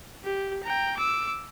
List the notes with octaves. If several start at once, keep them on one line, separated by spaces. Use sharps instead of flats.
G4
G5 A#5
D6 E6